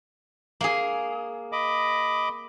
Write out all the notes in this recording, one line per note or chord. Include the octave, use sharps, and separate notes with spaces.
A#3 G#4
D#5 B5 D6